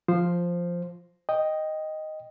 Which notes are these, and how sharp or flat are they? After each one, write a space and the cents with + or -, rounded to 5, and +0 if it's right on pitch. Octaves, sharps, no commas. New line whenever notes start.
F3 +0 C5 +0
D#5 +0 G5 +0